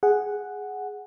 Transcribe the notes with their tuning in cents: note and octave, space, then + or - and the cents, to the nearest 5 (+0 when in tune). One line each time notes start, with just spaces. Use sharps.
G#4 +0 F#5 +0